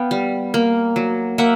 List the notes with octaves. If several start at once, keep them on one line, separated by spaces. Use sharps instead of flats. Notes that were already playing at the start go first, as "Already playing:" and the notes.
Already playing: B3 F5 G5
G3
A#3
F#3
A#3 E5 F#5